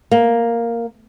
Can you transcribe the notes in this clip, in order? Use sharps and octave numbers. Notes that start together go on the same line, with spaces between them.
A#3